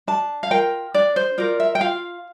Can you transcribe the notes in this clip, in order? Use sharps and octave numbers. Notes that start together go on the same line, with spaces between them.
D4 A5
F5
F4 A#4 G5
D4 D5
C5
F4 A#4 D5
E5
G5
F4 F5